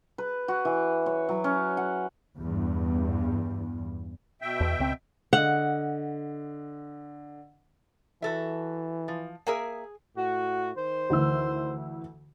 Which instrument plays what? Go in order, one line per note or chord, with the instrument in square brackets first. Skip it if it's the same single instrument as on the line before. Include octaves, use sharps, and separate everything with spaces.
[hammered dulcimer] B4
F#4
E3
C#5
F#3
C#4
F#5
[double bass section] E2 G2
[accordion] B2 E5 G5
[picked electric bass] E2
C#2 C4
[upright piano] D3 D#5 [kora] F#5
[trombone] E3 [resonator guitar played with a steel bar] F#4 A4 E5
[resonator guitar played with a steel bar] F3
[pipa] A#3 A#4 E5 [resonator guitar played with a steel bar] G#4 G#5
[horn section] A2 F#4
D#3 C5
[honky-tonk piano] D2 E3 E6